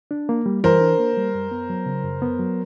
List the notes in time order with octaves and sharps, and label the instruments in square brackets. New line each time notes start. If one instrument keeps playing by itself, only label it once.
[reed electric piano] D4
A#3
G3
[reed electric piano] E3 [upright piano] A#4 C5
[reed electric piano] D4
A#3
G3
F#2
B3
F#3
C#3
F#2
B3
F#3